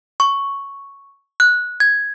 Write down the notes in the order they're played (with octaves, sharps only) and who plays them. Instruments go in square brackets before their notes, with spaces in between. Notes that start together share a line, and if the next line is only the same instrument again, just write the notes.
[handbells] C#6
F#6
G#6